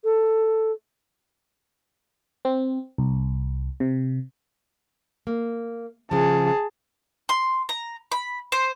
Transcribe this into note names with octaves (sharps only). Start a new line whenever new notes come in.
A4
C4
C2
C3
A#3
C#3 F3 G#4 A5
C6
A#5
B5
C5